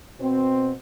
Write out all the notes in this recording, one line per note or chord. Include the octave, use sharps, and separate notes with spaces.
B2 C4